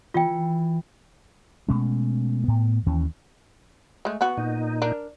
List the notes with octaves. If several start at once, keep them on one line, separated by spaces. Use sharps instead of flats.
E3 F4 G5
B2 G#3 A3 C#4
A2 B3
D#2 E3 C#4
G#3 A3
B3 F#4
A#2 D#4
D4 A#4